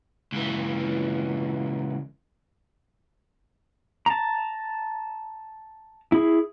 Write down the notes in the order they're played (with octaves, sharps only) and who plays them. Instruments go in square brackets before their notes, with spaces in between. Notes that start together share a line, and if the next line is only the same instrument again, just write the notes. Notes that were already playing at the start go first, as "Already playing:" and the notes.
[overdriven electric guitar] C#2 E3
[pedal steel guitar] A5 A#5
E4 G#4